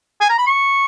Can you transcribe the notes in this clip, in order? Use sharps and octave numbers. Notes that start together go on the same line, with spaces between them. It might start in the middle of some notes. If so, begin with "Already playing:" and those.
G#5
A#5
B5
C#6